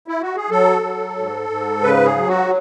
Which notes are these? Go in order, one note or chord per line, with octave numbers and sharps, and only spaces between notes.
E4
F#4
G#4
F#3 A4
F#3
G#2
G#2
C#3 B4
G#4
F#3
F#4